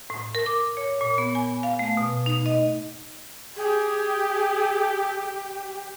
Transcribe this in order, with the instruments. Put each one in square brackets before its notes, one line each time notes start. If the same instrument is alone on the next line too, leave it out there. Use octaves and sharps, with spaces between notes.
[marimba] A2
A#4
D6
C#5
A#2
B3
G#5
F5
A3
B2
D#4
D#5
[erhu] G4 [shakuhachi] G#4